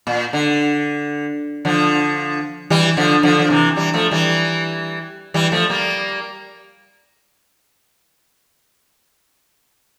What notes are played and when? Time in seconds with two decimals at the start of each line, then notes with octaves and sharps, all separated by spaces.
0.07 A#2
0.33 D3
1.65 D3 F3
2.70 E3 G3
2.97 D3 F3
3.23 D3 F3
3.39 F3
3.50 C3 E3
3.76 E3 G3
3.94 F3 A3
4.11 E3 G3
5.34 E3 G3
5.52 F3 A3
5.70 G3 A#3